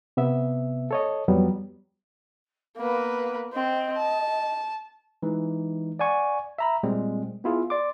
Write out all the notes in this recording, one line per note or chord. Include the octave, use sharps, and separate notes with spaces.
C3 B3 E5
A4 C#5 D#5
F2 F#3 G3 B3
A#3 B3 B4
C4 D#5
A5
E3 G#3 D#4
D5 F#5 G#5 C#6
E5 A#5 B5
A#2 G3 G#3 C4
B3 E4 F4 G#4
D5 C6 D6